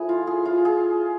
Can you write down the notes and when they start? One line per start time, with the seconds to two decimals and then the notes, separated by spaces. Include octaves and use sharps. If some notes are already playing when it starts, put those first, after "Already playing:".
Already playing: F3 A3 E4 G#4 B4
0.09 F4
0.27 G#4
0.45 F4
0.65 G#4